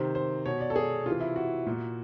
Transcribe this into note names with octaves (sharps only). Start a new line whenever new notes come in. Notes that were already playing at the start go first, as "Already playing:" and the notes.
Already playing: C3 D#3 C5
C5
B2 C#5
D5
A4
G#4
C3 E3 F4
E4
F#4
A#2